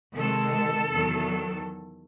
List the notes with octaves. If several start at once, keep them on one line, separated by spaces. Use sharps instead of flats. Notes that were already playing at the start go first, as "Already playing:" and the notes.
C3 D#3 G#3 A4
E2 D#3 F#3